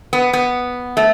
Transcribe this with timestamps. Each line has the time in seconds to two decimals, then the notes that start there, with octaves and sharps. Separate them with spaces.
0.13 B3
0.33 B3
0.97 A3